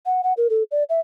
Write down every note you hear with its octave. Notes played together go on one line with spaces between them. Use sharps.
F#5
F#5
A#4
A4
D5
E5